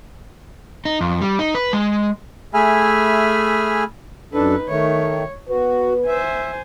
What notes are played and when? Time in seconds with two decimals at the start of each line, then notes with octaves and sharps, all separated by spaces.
0.85 D#4
1.01 F2
1.21 G3
1.39 D#4
1.55 B4
1.73 G#3
2.54 A3 G#4 E5 G#5 B5 F6
4.34 F#2 D4 D#4 A4 B4
4.69 D#3 A3 C#5
5.49 B3 F#4 B4
6.07 C5 E5 G#5